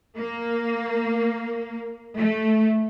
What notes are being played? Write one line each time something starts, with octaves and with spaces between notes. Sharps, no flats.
A#3
A3